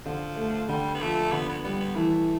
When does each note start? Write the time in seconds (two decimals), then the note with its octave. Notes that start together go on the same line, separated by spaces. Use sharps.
0.05 D3 F3
0.36 A3
0.68 D3 G3
0.95 B3
1.01 F3 A3
1.32 D3 B3
1.49 B3
1.64 G3 B3
1.80 B3
1.95 E3 A3